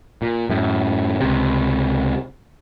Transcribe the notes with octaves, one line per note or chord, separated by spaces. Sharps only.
A#2
F#2 A2
C#2 C3